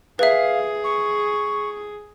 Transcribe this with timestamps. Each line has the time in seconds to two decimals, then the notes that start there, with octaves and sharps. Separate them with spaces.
0.19 G#4 B4 E5 F5
0.84 C#6